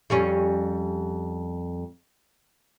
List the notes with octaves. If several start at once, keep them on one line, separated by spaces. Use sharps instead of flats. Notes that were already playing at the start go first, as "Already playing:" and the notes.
F2 G3 C#4